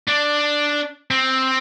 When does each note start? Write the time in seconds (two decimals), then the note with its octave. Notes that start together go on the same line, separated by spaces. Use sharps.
0.08 D4
1.11 C4